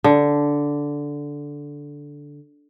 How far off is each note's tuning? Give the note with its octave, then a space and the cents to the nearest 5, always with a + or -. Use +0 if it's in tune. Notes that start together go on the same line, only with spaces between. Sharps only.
D3 -10